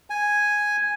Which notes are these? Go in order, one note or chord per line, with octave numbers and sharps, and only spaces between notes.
G#5